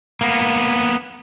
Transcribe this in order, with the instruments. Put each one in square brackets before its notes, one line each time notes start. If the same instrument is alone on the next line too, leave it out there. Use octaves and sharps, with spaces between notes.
[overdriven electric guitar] A#3 B3